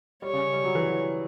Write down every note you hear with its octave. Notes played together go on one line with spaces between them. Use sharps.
G3 C#5
C#3
G3
F#3
E3
F#3